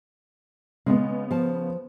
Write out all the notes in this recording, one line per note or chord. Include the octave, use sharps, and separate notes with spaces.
C#3 G#3 B3
F3 A5